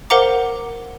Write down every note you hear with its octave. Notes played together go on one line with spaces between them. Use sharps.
A#4 C5 F5 F#5 A#5 D6